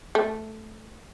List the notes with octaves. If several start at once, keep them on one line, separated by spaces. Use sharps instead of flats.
A3